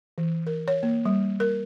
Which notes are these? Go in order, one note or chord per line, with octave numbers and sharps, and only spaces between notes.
E3
A#4
C#5
A#3
G3
A#4